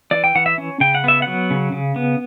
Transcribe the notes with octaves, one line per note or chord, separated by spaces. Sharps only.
E3 D5
G5
E3 F#5
E5
C#4
C#3 G5
F#5
B3 E5
F#3 F#5
C#3
C#3
B3